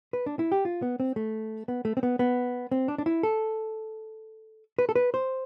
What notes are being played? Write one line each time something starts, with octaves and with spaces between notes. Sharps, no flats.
B4
D4
E4
G4
F4
B3
C4
A3
B3
A3
C4
B3
B3
C4
D4
D4
E4
A4
B4
A4
B4
C5